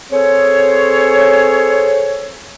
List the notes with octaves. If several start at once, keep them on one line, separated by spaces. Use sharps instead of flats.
C4 G#4 A4 C5 C#5